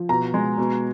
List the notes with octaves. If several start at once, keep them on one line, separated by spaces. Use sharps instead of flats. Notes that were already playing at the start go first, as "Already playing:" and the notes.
Already playing: F3
B2 A#5
G#3
B2